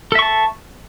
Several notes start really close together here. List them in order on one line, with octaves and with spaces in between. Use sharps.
A4 E5 C#6 A5